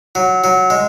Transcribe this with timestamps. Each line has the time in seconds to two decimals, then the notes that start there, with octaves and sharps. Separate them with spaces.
0.15 F#3
0.44 F#3
0.70 G#3